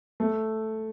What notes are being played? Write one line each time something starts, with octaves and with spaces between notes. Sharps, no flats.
A3